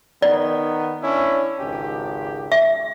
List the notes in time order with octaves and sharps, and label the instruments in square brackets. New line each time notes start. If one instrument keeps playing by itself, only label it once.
[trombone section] D#3 B3 [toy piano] D5
[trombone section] C#4 D4 E4
G#1 C#2 G4
[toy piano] E5